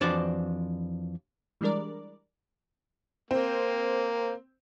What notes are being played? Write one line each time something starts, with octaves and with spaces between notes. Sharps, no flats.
F2 E3 D4 F#4 C5 D5
E3 G3 G#3 D4 A#4 D5
A#3 C4